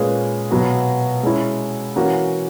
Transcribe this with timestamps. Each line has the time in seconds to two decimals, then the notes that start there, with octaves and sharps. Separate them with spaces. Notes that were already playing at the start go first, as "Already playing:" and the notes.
Already playing: A#2 G#3 C#4 G#4 B4
0.51 B2 F#3 B3 F#4
1.23 G#3 C#4 E4
1.96 E3 A#3 C#4 F#4